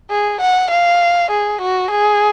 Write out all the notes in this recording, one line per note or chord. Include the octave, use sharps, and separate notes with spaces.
G#4
F#5
F5
G#4
F#4
G#4